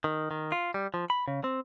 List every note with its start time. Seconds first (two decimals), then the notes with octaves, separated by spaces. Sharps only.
0.04 D#3
0.31 D#3
0.52 F4
0.74 G3
0.94 F3
1.10 B5
1.28 C#3
1.44 C4